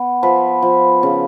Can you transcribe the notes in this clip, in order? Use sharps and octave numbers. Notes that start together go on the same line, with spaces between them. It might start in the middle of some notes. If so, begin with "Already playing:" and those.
Already playing: B3
F3 B4
F3
C#3